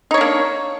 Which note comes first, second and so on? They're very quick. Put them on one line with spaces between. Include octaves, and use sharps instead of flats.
D#4 C#5 D4 A#3